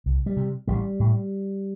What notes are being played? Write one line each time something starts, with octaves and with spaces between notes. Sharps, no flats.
C2
G3
C3
A1 G3
A2